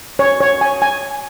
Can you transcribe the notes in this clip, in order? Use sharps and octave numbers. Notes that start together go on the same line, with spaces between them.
C#5
C#5
G#5
G#5